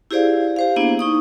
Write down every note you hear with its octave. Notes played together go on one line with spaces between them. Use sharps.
E4 G4 G#4 C5 D5 F5
G4 C5 F5
A#3 B3 D4 E4 G#4 C5
D#4 C#6 D#6